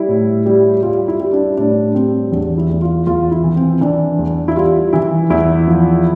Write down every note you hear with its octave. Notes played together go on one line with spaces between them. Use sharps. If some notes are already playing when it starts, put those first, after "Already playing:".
Already playing: G3 E4
A2
G3
G3 F4
E4
G3
D4
A2 D4
G3 C4
E2 D4
E4
E2
F4
E2 F4
E4
E3
C4
E3 D4
E2
E4
G3 F4
E3 E4
E2 E4
F3